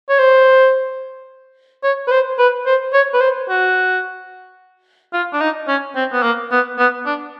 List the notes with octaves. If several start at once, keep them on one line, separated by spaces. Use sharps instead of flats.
C#5
C5
C#5
B4
C5
B4
C5
C#5
B4
C5
F#4
F4
D4
D#4
C#4
C4
B3
A#3
B3
B3
D4